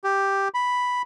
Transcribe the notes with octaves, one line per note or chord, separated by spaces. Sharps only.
G4
B5